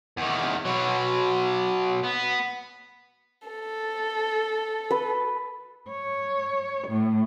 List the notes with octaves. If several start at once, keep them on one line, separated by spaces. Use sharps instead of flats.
E2 D#3
B2 F#3
B3
A4
B4
C#5
A2